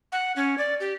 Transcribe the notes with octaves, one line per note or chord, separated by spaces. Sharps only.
F#5
C#4
D5
G4